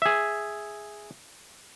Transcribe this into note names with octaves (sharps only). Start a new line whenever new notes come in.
G#4 E5